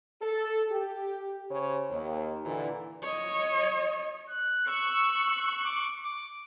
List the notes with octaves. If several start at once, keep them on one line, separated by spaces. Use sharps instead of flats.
A4
G4
C#3 C5 C#5
D#2
A#2 D3 E3
C#5 D#5
F#6
C#6 E6 F#6
D6
D6